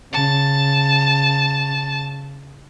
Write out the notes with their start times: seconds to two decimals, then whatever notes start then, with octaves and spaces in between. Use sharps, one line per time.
0.13 C#3 A5